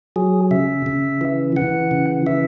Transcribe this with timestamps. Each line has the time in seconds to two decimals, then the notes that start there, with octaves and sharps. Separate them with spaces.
0.16 F#3 G#4
0.51 C#3 E5
0.86 C#3
1.21 E3
1.56 E3 F#5
1.91 C#3
2.26 E3 E5